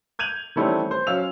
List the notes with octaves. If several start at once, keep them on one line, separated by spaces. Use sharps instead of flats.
G6 G#6 D#7 F7 F#7
D#3 E3 G3 A3 C4 C#4
C5
F#3 C#4 F5 E6 F7